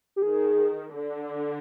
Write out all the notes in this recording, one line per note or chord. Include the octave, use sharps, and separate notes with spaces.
G4
D#3 G#4
D3